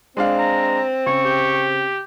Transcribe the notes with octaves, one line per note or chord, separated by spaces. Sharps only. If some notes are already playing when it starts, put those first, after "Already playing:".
G#3 C4 D4 F5
A#5
C#3 C#6
G4